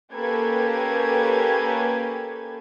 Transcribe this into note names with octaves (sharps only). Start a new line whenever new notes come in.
A#3 C#4 G4 A4 B4 G#6